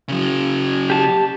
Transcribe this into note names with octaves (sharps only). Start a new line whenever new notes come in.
C#3 F#3
G4 A5